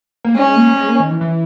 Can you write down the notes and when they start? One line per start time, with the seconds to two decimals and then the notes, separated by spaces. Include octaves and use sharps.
0.25 A#3
0.35 G#3 C#4
0.56 A#3
0.73 G3
0.78 G#3
0.88 A#3
1.00 D#3
1.11 E3
1.21 E3